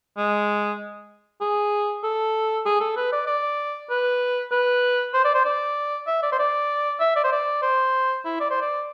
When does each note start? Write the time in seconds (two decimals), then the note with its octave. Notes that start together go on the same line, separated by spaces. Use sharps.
0.17 G#3
1.41 G#4
2.04 A4
2.65 G#4
2.80 A4
2.96 B4
3.12 D5
3.27 D5
3.90 B4
4.52 B4
5.14 C5
5.24 D5
5.34 C5
5.45 D5
6.07 E5
6.23 D5
6.32 C5
6.38 D5
7.00 E5
7.16 D5
7.24 C5
7.32 D5
7.62 C5
8.25 E4
8.40 D5
8.50 C5
8.61 D5